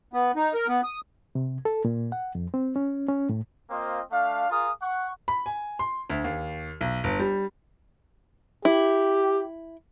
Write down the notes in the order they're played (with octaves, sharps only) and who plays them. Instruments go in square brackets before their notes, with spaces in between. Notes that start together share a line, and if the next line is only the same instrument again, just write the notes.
[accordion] B3
D#4
A#4
B3
D#6
[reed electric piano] C3
A4
A#2
F#5
F2
C4
C#4
C#4
A2
[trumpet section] A#3 C4 F4 C5 D#5
A3 D4 F5
F4 G#4 A#4 F5 D#6
F#5 C#6
[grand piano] B5
G#5
C6
D2
D#2
B1
G1
G3
[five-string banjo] E4 [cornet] G4